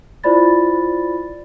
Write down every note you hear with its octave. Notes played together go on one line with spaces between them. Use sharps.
E4 F4 C5 D5 B5 A6